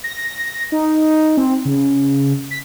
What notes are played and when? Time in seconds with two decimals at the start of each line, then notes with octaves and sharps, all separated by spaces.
0.04 A#6
0.72 D#4
1.37 C4
1.65 C#3
2.51 B6